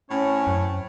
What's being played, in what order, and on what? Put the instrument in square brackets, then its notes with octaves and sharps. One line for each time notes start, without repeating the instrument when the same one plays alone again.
[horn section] A2 C4 C#5 [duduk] C#4
[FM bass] F#2